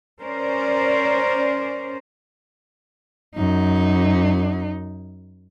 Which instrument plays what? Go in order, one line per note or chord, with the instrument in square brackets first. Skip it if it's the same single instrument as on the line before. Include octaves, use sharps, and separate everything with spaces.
[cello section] C#4 A#4 C5 D5
[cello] F#2 D#4